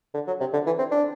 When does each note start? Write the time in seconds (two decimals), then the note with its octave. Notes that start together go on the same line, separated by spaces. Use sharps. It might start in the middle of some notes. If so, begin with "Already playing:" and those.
0.14 D3
0.27 F#3
0.40 C3
0.53 D3
0.66 E3
0.79 C4
0.91 D4